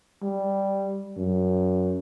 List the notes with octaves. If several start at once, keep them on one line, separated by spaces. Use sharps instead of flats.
G3
F#2